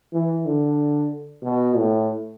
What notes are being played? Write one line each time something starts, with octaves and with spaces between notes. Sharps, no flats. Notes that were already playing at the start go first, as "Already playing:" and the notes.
E3
D3
B2
A2